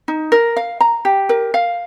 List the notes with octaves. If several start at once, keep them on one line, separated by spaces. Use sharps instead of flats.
D#4
A#4
F5
A#5
G4
A#4
F5